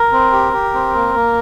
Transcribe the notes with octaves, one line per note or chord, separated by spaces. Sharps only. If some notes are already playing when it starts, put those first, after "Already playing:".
Already playing: A#4
C4
G4
G4
C4
A#3
A#3